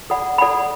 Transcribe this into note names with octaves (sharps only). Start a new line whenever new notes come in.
A4 D5 F#5 B5
A4 D5 F#5 B5